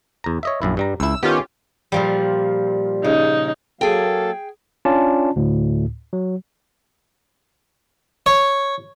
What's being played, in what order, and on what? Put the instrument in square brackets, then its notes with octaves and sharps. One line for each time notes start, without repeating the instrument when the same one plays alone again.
[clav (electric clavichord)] E2 A#5
C#5 D#5 E5
A#1 F#2 E4
G2 G3 A#5
[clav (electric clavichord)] C#2 E4 [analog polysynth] E6
[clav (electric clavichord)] D#3 B3 [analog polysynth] C#4 F4 G4
[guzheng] A#2 F3 G3
[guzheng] C#3 [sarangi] D#4
[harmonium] F#3 A#3 F5 [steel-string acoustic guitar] G#4 G5 [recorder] A4
[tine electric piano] C#4 D4 F4 D5 A5
D2 A2
F#3
[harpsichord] C#5